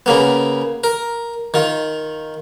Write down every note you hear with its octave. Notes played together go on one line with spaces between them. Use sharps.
C#3 A#3 B3
A#4
D#3 F4